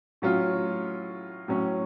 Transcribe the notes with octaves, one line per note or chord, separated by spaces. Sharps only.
A2 F#3 C#4 F4
A2 F#3 C#4